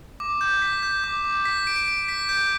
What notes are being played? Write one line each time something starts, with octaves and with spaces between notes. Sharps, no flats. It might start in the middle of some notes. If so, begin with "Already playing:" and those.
D6
G6
B6
G6
D6
D6
B6
D7
D7
B6
G6